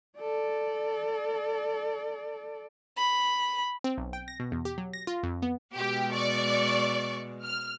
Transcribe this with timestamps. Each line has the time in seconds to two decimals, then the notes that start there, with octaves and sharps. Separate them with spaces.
0.19 A4 D5
2.98 B5
3.84 C4
3.97 B1
4.13 G5
4.28 A#6
4.40 B2
4.52 E2
4.65 G4
4.78 F#3
4.93 A#6
5.07 F4
5.23 F2
5.42 B3
5.76 B2 G#3 G4
6.12 D5 C#6
7.44 F6